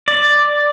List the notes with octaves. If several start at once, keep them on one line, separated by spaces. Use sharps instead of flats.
D5